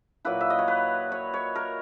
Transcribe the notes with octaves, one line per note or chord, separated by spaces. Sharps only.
A#2 F#3 A#3 E4 B4
E5
D#5
C#5
B4
C#5
C#5
A#4